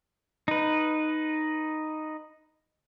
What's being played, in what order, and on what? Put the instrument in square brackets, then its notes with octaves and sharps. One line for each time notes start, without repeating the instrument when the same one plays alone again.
[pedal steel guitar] D#4 B4